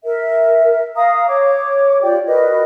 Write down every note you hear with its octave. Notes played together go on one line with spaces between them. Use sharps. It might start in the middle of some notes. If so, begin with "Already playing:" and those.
A#4 E5
F5 A#5 D#6
C#5 D6
F4 G4 D5 G5
F#4 A#4 B4 D#5